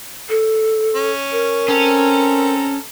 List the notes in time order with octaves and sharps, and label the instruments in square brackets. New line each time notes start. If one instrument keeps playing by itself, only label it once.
[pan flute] A4
[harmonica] C#4
[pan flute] A#4
[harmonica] C4 A4 A#5 [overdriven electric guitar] C#4